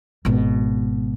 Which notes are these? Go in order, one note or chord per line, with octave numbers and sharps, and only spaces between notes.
G#1 B2